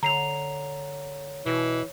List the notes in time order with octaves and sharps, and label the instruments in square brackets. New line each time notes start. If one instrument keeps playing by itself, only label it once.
[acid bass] D3 [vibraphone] C#5 [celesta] A#5 C7 F7
[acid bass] B2 [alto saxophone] E3